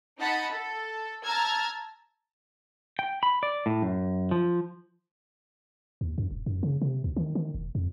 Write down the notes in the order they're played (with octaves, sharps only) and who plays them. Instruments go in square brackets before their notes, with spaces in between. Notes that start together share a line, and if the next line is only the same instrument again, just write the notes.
[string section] D#4 F#5 A5 B5
A4
A5 A#5 E6 F6 G#6
[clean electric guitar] G5
B5
D5
A2
F#2
F3
[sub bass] D#2
F#2
D#1
F#2
C#3
C3
D2
D#3
D#3
E1
F2